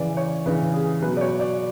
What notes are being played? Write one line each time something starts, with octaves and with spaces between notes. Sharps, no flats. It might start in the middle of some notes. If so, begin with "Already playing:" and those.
Already playing: C#3 E3 D5
C#5
C#3 E3 B4
G#4
B2 F#3 B4
D5
C#5
D5